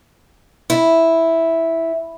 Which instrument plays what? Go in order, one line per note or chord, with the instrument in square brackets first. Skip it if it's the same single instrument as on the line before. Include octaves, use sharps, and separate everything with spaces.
[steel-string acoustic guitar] E4